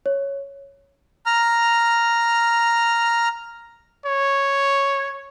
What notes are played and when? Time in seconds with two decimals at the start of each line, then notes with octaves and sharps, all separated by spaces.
0.06 C#5
1.26 A#5 F6
4.06 C#5